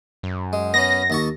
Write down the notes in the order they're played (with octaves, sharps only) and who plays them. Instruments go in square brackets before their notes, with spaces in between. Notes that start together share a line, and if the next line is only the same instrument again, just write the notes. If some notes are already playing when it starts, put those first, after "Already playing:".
[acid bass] F#2
[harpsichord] G#3
[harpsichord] B3 C#4 [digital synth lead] A#6
[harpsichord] D#2 A5 C#6